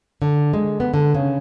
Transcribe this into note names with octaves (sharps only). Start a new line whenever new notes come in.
D3
G#3
B3
D3
C#3